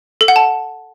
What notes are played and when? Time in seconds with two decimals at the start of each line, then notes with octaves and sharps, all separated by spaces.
0.21 A4
0.28 F#5
0.36 A5